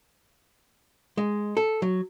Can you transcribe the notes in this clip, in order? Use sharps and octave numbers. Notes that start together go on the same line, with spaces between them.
G#3
A4
F#3